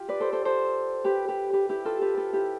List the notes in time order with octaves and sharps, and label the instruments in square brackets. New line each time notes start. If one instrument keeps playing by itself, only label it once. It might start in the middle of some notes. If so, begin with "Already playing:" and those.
Already playing: [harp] F4 G4
B4 D5
A4 C5
A4 C5
A4 C5
G4 B4
G4 B4
G4 B4
E4 G4
F4 A4
G4 B4
F4 A4
E4 G4